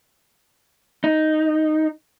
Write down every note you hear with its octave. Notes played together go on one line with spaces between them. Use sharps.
D#4